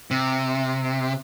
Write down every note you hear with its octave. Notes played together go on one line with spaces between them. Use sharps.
C3